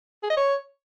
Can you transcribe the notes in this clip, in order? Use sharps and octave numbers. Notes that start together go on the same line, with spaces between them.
G#4
D#5
C#5